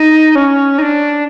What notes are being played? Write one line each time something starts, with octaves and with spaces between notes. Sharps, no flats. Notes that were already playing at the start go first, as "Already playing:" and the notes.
Already playing: D#4
C#4
D#4
D4